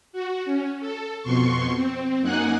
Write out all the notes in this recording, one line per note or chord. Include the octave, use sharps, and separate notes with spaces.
F#4
C#4
A4
F2 B2 C6 C#6
C4
F#2 A#3 D#4 F#5 G#5 F#6